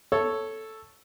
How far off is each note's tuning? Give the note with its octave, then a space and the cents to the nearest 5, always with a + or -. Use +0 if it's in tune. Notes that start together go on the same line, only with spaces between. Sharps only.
A4 +0 C#5 +0